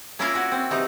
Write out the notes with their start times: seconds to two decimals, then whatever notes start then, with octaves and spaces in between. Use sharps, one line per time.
0.19 A#3 C#4 E4 F4 A#4 F5
0.35 C#4 F#4
0.51 C4
0.70 C3 E3 D#4